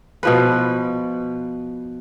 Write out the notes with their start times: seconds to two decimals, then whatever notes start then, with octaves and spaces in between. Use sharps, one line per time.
0.23 B2 F3 B4